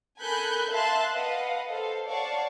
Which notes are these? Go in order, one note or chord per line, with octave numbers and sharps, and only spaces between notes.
A4 A#4 G#5 B5 F#6 G6
E5 F5 A5 C6 F#6
B4 D#5 F5 F#5
A4 C5 F5
C#5 D5 F5 F#5 A5 C#6